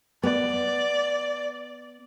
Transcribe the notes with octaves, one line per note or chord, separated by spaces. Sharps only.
B3 D5